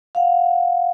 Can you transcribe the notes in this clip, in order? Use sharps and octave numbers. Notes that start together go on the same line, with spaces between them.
F5 F#5